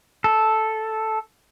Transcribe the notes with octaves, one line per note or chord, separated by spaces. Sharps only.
A4